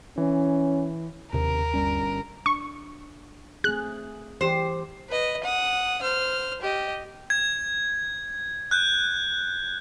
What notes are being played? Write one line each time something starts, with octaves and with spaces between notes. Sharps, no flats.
E3 C#4
E1 D#2 C3 D#3 A#4
G1 G3 C#4
D4 C#6
A3 C4 G#4 F#6
E3 G4 C5
B4 D#5
F#5 D#6
C5 F6
G4 D#5
G#6
F#6 G6